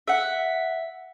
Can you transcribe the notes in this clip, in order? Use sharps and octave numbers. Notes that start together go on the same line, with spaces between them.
E5 F#5